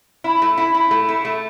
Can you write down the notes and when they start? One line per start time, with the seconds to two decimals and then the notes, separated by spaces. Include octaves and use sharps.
0.24 E4
0.42 A3
0.58 E4
0.74 E4
0.91 A3
1.08 E4
1.25 A3